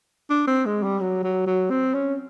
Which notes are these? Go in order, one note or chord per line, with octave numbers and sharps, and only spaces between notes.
D4
C4
G#3
G3
F#3
F#3
F#3
C4
C#4